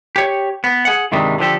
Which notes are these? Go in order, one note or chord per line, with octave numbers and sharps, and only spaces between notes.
G4 C#5
B3
G#4 F#5
G2 C3 D#3 E3 G3 G#3
D3 F3 G4 A4